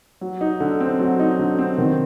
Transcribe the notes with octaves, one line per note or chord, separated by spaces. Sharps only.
F#3
D#4
D3
C4
F#3
D#4
D3
C4
D#3